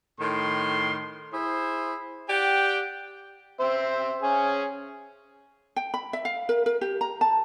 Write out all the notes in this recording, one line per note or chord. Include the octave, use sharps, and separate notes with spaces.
A2 D#3 C6
E4 G#4 C5
G4 D5 F#5 G5
C4 C5 E5
C#4 G#4
G5
B5
E5
F5
A#4
A#4
G4
A#5
A5